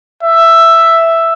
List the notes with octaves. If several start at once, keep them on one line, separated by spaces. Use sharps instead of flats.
E5